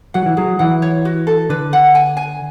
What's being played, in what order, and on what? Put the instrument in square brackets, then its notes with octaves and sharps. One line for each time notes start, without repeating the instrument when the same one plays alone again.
[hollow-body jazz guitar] F#3 [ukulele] F#5
[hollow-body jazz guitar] E3
[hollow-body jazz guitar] F#3 [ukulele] G#4
[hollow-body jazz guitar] E3 [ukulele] F#5
[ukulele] C#5
F#4
A4
[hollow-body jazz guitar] D3 [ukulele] B4
[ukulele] F#5
G#5
G#5